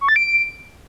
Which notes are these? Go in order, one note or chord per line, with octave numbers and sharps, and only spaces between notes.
C#6
A6
D7